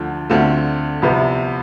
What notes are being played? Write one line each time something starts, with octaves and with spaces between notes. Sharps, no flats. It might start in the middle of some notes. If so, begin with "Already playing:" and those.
Already playing: D2 D3 F3
D2 D3 A3 C4 F4
C2 C3 F3 B3